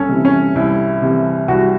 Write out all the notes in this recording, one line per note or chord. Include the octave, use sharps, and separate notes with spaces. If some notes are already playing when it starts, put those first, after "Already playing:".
Already playing: C2 C#4 A4
C3 E3
C#4
C2 E4
C3 E3
C2 F#4